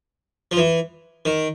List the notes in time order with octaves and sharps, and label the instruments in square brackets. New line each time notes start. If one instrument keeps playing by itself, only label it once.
[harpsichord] F3
E3
D#3